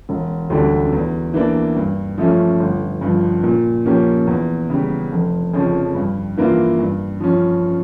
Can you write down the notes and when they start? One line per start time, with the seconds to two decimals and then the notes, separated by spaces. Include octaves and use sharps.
0.09 E1
0.50 D2 D3 G3 D4
0.93 E2
1.34 E3 A#3 D4
1.76 G2
2.18 F3 A3 C#4
2.60 G1
3.01 G2 F3
3.43 A#2
3.86 F3 A#3 C#4 G4
4.27 E2
4.70 C#3 G3
5.12 F1
5.53 F2 C#3 F3 C#4
5.95 G2
6.38 E3 A#3 D4 F4
6.79 G2
7.20 F3 C#4